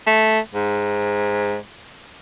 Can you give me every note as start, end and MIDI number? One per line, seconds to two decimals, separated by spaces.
0.07 0.39 57
0.55 1.56 44